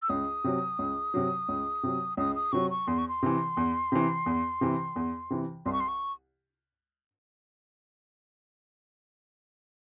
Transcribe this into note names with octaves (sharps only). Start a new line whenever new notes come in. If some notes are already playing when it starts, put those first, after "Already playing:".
E6
C#2 D#6
C3 F#3
C#2
C3 F#3
C#2
C3 F#3
C#2 D#6
D#6
C3 F#3 C#6
C#6
E2 C6
C#6
C6
C3 E3
E2
C3 E3
E2
C3 E3
E2
C3 E3
C2 C6
C#6
C6
C#6